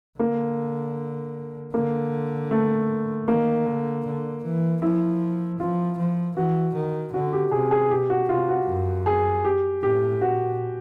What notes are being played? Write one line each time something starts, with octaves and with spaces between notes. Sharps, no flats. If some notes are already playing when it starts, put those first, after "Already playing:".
D3 A#3
D3 A#3
A3
D#3 A#3
D3
D3
E3
F3 E4
F3 F4
F3
E3 F#4
D#3
D3 F#4
G4
C3 G#4
G#4
B2 G4
F#4
C3 F4
F#4
F#2
G#4
G4
A2 G4
A#2 F#4